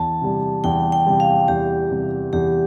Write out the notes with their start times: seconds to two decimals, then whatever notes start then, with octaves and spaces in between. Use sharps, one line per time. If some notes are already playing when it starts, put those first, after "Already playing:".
Already playing: E2 A5
0.22 C3 G3
0.64 E2 G5
0.92 G5
1.07 C3 G3
1.20 F5
1.48 E2 G4
1.90 C3 G3
2.33 E2 G4